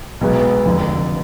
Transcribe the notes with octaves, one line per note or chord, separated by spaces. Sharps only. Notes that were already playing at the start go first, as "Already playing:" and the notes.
B1 B2 G#3 B3
F1 F2 D3